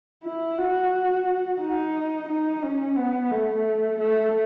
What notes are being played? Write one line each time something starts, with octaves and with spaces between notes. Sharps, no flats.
E4
F#4
D#4
D#4
C#4
B3
A3
A3